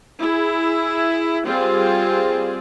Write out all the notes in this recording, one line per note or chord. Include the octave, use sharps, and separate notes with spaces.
E4 G#4
G3 C4 F4 G#4